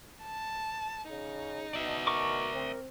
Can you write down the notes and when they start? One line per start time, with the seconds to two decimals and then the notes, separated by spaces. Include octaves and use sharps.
0.23 A5
1.10 C#3 D#4
1.73 B2 D5 E5
2.07 A#4 C#6 D6
2.53 C4